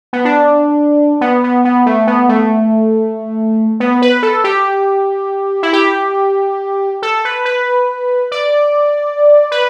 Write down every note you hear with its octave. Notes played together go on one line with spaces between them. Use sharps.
B3
D4
B3
B3
B3
A3
B3
A3
B3
B4
A4
G4
E4
G4
A4
B4
B4
D5
B4